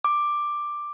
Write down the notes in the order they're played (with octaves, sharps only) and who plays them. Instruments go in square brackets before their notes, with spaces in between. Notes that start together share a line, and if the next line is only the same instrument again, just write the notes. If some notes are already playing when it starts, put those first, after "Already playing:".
[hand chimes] D6